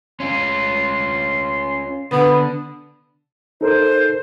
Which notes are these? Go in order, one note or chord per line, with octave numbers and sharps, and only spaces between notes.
C#4 F4 C6
D3 B3
D#4 A4 A#4 C5